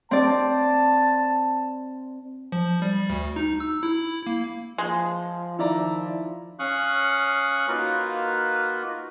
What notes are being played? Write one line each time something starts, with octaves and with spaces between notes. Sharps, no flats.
C4 D5 A5
F3
G3
D2
D#4
E6
E4
A#3
F3 G#3
D#3 F3 E4 D5 A#5
C#4 F5 C#6 D#6 F#6
A#3 D#4 F4 F#4 A#4 B4